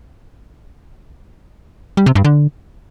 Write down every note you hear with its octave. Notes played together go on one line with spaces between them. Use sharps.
G3
C3
G2
D3